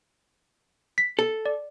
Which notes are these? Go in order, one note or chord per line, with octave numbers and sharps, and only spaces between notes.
B6
A4
D5